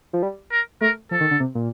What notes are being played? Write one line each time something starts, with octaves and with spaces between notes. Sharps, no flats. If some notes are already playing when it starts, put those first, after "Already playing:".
F3
G3
A#4
A3 A#4
F3 A4
D#3
D3
C3
A#2